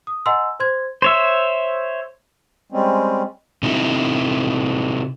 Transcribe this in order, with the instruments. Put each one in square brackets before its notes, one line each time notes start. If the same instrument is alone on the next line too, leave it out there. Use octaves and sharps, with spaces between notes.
[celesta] D#6
D#5 F#5 G#5 A#5 C6 E6
C5 C6 G#6
[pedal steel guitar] C5 C#5 E5
[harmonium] G3 G#3 C4 C#4
[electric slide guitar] C3 D#4 E4